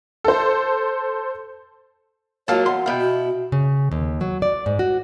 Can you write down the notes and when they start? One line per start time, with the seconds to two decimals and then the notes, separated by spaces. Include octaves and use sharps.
0.24 A4 C5
2.48 F#3 G#3 A#3 F4 C#5 F5 A5
2.66 E2 F#5 C6
2.86 B2 E4 F5 G5
3.01 F#4
3.52 C#3
3.92 D#2
4.21 F#3
4.42 D5
4.66 G#2
4.79 F#4